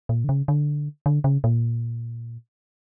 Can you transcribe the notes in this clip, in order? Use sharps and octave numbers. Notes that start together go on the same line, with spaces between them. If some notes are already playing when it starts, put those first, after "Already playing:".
A#2
D3
C#3
D3
D3
C#3
A#2